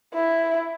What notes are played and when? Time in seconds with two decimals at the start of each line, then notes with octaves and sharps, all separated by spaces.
0.14 E4